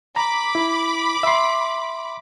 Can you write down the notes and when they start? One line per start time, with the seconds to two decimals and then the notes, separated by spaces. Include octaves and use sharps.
0.16 A#5 B5 D6
0.55 E4
1.23 E5 C6